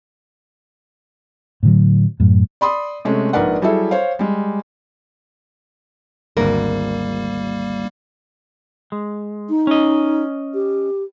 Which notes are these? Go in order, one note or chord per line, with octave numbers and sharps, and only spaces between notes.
A2 D3 F#3
F#2 A2
D5 B5 C6 D#6
C3 G#3 A3 C#4
A#1 G#2 A#4 B4 D5 F#5
F#3 G3 E4 G#4 A4 E5
C5 C#5 F5
G3 G#3
G#1 D2 G3 A#3 A#4
G#3
D#4
C#4 D#5
G4